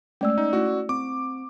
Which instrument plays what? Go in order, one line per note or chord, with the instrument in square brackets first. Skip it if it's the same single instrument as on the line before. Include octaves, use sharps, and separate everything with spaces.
[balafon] G#3 A3 [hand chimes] C#4 D5 E6
[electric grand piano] D#4
[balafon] A3 E4 [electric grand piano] F#4
[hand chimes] C4 [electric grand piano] D6